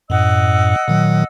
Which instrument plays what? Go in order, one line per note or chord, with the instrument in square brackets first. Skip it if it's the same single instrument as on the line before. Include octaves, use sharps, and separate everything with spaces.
[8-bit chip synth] F#2 A2 [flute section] D#5 F#5 E6
[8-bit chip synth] A#2 D#3 F#3